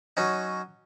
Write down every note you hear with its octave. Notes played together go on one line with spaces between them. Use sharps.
F#3 C#4 D#4